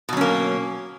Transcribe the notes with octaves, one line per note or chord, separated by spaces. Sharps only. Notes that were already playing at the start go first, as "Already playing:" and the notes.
B2 F#3 A#3 C#4